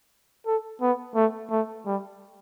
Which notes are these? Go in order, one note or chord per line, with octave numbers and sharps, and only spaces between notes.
A4
B3
A3
A3
G3